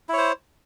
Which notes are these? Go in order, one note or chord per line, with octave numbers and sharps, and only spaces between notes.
E4 C5 C#5